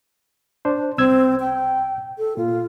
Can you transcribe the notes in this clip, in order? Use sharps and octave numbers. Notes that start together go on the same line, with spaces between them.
D4 C5
C2 C4 E6 G#6
G5
A4
A#2 F4